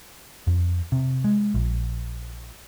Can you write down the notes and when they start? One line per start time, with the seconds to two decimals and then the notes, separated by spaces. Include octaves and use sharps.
0.47 F2
0.92 C3
1.24 G#3
1.54 A#1